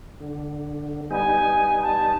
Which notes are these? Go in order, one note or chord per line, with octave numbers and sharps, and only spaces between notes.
D3
G3 B3 D#4 G#5
A5